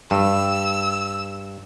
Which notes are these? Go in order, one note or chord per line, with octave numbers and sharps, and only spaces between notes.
G2 E6